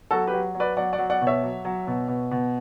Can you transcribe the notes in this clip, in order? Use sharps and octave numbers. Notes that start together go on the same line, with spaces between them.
F#3 F#4 A4
G4 B4
F#3
F#3
B4 D5
F#3 D5 F#5
D5 F#5
F#3
D5 F#5
B2
C#5 E5
F#3
F#3
B2
B2
B2